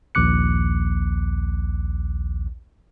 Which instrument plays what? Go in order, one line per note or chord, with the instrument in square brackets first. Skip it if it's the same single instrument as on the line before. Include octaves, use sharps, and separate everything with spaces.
[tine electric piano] A#1 D#2 D6 F#6 C#7